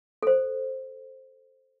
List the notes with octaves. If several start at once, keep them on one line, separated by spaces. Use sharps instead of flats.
A4 C5